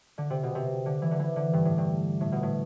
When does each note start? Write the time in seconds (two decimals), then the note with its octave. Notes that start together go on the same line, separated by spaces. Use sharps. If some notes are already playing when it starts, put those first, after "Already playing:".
0.18 D3
0.30 C3
0.43 B2
0.55 C3
0.86 D3
1.02 E3
1.11 D3
1.19 E3
1.36 D3
1.53 G2
1.65 A2
1.78 G2
2.21 A2
2.32 B2
2.43 A2